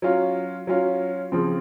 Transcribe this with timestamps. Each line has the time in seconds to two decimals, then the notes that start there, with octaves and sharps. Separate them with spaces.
0.02 F#3 C#4 F4
0.67 F#3 C#4 F4
1.32 C#3 F3 C4